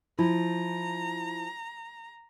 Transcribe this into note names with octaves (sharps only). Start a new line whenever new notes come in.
F3 E4 A#5